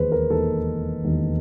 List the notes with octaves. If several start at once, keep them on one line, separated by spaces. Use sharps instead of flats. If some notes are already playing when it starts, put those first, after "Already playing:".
Already playing: E1 D#2 D#3 G#4 B4 C5
A#4
E1 D#2 D#3 A4
E1 D#2 D#3